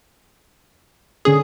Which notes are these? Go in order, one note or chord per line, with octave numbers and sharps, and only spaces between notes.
D3 C#4 G#4 D#6